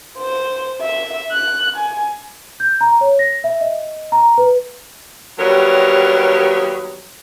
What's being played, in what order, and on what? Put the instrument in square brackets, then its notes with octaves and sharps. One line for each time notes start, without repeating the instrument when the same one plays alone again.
[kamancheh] C5
E5
F#6
G#5
[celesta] G6
A#5
C#5
A#6
E5
D#5
A#5
B4
[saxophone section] D#2 F#3 G3 B3 A#4 C#5